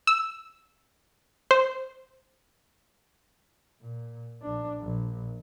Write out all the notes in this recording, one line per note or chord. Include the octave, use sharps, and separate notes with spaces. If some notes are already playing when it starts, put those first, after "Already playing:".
E6
C5
A#2
A#1 D4
A#1